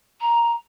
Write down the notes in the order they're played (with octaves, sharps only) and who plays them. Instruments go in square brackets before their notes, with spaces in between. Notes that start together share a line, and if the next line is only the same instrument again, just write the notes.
[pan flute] A#5